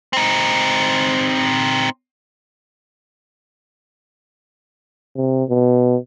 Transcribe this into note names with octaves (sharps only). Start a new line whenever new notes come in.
C4 D#4
C3
B2